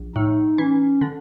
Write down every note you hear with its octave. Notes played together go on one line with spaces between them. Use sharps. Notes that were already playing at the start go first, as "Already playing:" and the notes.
Already playing: A#1
A2 D#4
E3 C#4
D3